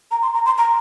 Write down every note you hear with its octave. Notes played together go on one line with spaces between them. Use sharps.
A#5
C6
A#5
C6
A#5